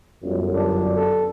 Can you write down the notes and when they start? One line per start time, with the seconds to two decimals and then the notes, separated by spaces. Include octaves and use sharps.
0.22 G1 F#2
0.55 D4
0.96 A4